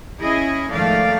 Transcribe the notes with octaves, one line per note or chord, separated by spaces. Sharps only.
C#4 E4 G#4 D#5
G#2 D#3 F3 A3 D5 F5